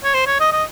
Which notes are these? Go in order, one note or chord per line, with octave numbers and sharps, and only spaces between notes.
C#5
C5
C#5
D#5
D#5